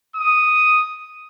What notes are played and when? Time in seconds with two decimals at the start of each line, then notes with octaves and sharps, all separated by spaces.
0.16 D#6